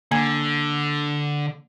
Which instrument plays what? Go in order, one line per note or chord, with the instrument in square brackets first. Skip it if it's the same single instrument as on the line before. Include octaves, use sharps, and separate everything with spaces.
[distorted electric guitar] D3 [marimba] A#3 G#5 G#6